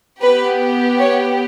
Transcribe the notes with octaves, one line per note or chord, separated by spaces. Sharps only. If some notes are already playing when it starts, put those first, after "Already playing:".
B3 G4 B4
C#5